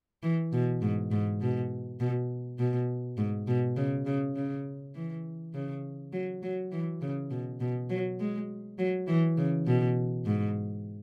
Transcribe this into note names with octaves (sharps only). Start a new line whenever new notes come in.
E3
B2
G#2
G#2
B2
B2
B2
G#2
B2
C#3
C#3
C#3
E3
C#3
F#3
F#3
E3
C#3
B2
B2
F#3
G#3
F#3
E3
C#3
B2
G#2